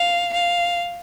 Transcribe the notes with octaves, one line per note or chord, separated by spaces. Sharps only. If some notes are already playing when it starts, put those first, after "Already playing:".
Already playing: F5
F5